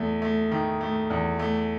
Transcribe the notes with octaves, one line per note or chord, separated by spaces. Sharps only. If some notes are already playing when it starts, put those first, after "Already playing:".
Already playing: E2 A3
A3
D#3
A3
E2
A3